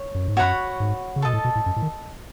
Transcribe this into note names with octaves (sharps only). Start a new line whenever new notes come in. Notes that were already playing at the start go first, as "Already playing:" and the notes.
Already playing: C#5
F#2
G#2
F#2 F#4 C#5 F#5 B5
G#2
C#3
B2 A4 D#5 A5
A2
B2
A2
F#2
A2
D#3